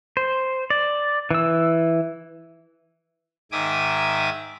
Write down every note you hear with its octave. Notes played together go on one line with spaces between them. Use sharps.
C5
D5
E3 E6
G#2 D#3 E5 G#5 D6 D#6